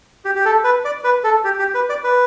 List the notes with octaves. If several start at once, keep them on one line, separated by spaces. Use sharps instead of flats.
G4
G4
A4
B4
D5
B4
A4
G4
G4
B4
D5
B4